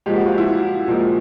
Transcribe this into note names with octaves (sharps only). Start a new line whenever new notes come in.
A#2 F3 G#3 G4
F#4
F4
E4 F#4
A#2 F3 G#3